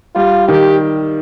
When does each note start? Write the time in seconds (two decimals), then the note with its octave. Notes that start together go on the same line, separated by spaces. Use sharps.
0.15 G3 F4
0.48 D#3 G4